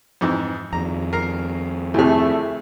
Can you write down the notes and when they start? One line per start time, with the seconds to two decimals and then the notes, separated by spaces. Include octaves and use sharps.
0.21 F2 G#2 E3
0.73 F2 D#3 A#5
1.13 A#4 A#5 C7
1.94 D2 C3 A3 E4 G#4